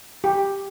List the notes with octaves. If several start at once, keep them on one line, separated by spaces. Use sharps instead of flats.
G4